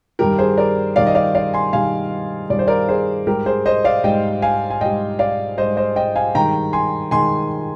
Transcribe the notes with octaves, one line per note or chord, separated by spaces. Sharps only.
G2 D#3 G3 G4 A#4
G#4 C5
A#4 D5
G2 D#3 G3 D5 F5
D#5
D5 F5
D5 F5
G#5 C6
G2 D#3 G3 F5 G#5
G2 D#3 G3 D5
C5
A#4 D5
G#4 C5
G#2 G3 G4 A#4
G#4 C5
C5 D#5
D5 F5
G#2 G3 D#5 G5
F5 G#5
G#5
G#2 G3 D#5 G5
D5 F5
G#2 G3 C5 D#5
C5 D#5
D#5 G5
F5 G#5
G2 D#3 G#3 G5 A#5
G#5 C6
D#3 G#3 G#5 C6